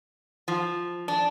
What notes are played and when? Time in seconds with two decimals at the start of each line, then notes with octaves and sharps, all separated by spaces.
0.48 F3
1.08 D4